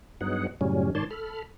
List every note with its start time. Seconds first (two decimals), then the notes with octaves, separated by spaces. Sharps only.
0.21 G2 F#3 B3 D#4 G#4 F#5
0.61 F#2 A2 C#3 F#3 G3 C#4
0.95 G#2 D#3 C#5 D5 A5 C6
1.11 A4 B5 F6